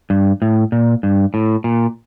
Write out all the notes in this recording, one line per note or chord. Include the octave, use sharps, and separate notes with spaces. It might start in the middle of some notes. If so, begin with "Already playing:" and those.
G2
A2
A#2
G2
A2
A#2